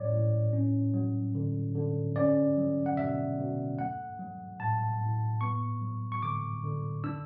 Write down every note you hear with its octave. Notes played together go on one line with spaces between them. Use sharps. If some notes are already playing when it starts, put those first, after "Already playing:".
Already playing: A2 F#3 C#4 C#5 D5
A2
C#4
F#3
D3
D3
C#4 D5
F#3
F#5
B2 E5
B2
A3 F#5
F#3
A2 A5
A2
B3 C#6
F#3
C#6
D3 D6
D3
D4 E6